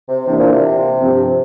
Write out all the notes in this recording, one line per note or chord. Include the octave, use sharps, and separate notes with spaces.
C3
C3 E3 A#3 D4
A#2
C3
G2 F3 C4 G4